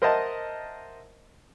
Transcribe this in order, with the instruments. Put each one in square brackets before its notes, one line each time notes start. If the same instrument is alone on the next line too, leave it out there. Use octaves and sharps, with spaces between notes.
[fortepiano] A#4 C5 D#5 E5 F#5 A5